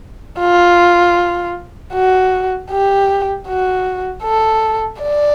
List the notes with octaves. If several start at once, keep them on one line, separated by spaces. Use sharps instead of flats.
F4
F#4
G4
F#4
A4
D5